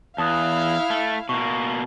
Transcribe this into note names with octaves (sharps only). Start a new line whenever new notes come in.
E2 E4 F5 A5 D#6 F#6
A3
B2 A#3 C#6